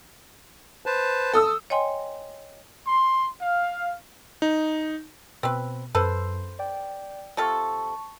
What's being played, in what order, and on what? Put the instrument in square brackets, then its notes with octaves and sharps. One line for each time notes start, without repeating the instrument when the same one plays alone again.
[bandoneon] B4 C5 A5
[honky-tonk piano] A4 D#6 E6
[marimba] C#5 D#5 G5 G#5 C6
[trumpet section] C6
F5
[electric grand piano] D#4
[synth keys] B2 [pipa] C4 B4
[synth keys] F#2 [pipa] A4 B4 C5
[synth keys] D5 G5
[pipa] C3 F4 A4 [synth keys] A5 C#6